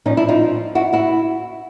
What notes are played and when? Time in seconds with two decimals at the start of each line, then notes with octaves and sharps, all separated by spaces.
0.05 A#2 F3 C#4 D#4
0.17 D4 E4
0.28 D#4 F4
0.75 E4 F#4
0.93 E4 F#4